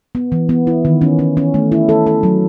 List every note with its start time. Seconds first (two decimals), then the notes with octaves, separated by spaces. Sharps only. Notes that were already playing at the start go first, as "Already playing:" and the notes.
0.15 B3
0.32 E3
0.49 B3
0.67 E4
0.85 D#3
1.02 C#4
1.19 C#4
1.37 C#4
1.54 A3
1.72 E4
1.89 A4
2.07 A4
2.23 F#3